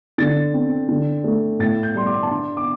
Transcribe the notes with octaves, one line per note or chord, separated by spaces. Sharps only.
D3 A6
C4
D3
A3
A2 A6
G6
G3 C6
D6
A5
D4 C6
D6